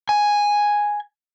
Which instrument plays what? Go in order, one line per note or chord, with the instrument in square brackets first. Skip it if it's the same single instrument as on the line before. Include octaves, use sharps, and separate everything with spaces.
[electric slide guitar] G#5